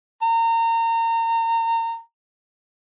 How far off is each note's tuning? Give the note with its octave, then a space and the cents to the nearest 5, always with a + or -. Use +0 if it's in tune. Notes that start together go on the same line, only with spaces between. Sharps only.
A#5 -30